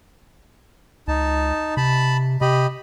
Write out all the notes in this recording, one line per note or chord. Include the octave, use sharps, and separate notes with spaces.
C#2 D#4 A5
C3 A5 B5
C3 G4 D#5 B5